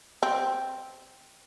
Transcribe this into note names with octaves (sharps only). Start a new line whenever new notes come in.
C4